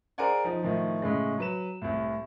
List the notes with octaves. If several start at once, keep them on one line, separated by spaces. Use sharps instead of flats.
G#4 A#4 C5 D5 F#5 G#5
F3 D#4
A2 D#3 F3
A2 C#3 G#3
F#3 B4 E7
C2 A2